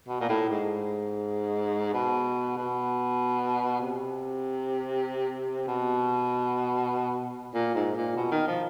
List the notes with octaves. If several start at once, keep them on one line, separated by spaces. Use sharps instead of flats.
B2
A#2
A2
G#2
B2
B2
C3
B2
A#2
G#2
A#2
B2
D#3
F3